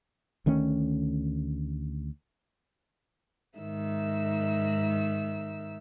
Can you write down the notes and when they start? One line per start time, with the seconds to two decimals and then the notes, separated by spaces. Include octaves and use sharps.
0.46 D2 D#3 A3 C#4
3.59 G#2 D#3 E5 E6